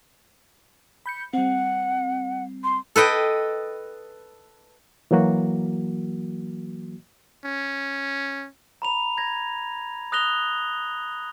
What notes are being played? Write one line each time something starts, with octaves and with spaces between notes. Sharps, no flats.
B5 G6 C#7
G3 C4 F#5
C6
A4 B4 D#5 G5
E3 F#3 A#3 F#4
C#4
A#5 B5 F7
G#6 A#6
D#6 F#6 A#6 F7 G7